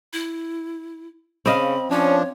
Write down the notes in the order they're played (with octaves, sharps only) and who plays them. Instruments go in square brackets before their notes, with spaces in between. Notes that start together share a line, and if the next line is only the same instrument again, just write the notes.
[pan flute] E4
[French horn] C#3 [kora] C4 D#5 F5 [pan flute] B5
[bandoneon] F3 D4 [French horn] C#4 [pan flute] C#5